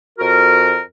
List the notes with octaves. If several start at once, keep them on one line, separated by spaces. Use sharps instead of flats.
F2 F#4 A#4